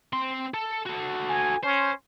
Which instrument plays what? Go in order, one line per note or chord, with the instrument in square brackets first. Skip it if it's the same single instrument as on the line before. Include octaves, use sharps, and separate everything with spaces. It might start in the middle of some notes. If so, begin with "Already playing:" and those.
[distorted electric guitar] C4 C6
A4
F#4 A4
[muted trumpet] G#5
[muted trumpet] C#4 [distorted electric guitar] C5